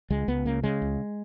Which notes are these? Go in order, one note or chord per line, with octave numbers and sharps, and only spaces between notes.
C#2 G#3
C#2 B3
C#3 A#3
C#3 G#3
C#2